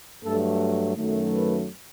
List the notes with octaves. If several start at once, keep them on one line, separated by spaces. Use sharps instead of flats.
G2 F#3 A3 A4
F#2 D#3 F#3 A3
B4